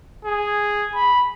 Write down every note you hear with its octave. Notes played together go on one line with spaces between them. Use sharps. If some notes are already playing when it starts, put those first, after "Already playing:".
G#4
B5